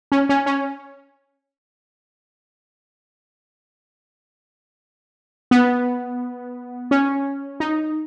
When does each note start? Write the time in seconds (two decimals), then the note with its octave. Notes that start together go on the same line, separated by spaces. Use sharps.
0.12 C#4
0.29 C#4
0.46 C#4
5.51 B3
6.91 C#4
7.60 D#4